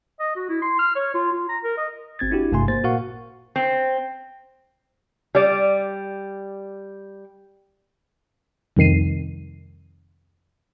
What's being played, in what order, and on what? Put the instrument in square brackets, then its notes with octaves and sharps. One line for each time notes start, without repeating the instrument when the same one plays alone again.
[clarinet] D#5
F#4
E4
C6
F6
C#5
F4
F4
A#5
A#4
D#5
[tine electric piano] G#1 C4 G#6 A6
D4 E4 F#4 G4
G#1 G2 C3 A3 G#5 C6
A#3 C5 A6
A#2 F#4 A#4 F5 F#5 C#6
[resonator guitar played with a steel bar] C4
G3 D5
[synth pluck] C2 F2 D#3 C7 D#7